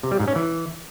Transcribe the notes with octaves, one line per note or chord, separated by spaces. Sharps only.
C3
G3
G#2
C#4
E3